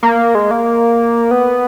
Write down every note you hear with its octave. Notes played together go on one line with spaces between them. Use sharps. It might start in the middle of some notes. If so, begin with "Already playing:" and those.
A#3
G#3
A#3
B3